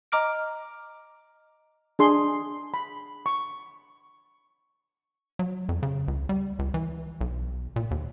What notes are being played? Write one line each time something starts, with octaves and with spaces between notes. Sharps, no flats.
D#5 A#5 D6 F6 D7
D4 G#4 C6
B5
C#6
F#3
F2
C#3
C#2
G3
C#2
E3
B1
A#2
D#2